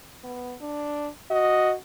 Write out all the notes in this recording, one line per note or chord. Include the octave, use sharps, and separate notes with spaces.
B3
D4
F#4 D#5